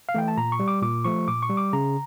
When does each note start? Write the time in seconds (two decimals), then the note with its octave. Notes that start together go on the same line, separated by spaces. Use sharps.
0.09 F5
0.15 E3 A3 G5
0.28 A5
0.37 A#2 A#5
0.52 C#6
0.59 G3
0.68 D6
0.82 A#2 D6
1.04 F3 A3 C#6
1.27 A#2 D6
1.43 C#6
1.50 G3
1.57 D6
1.73 C#3 A#5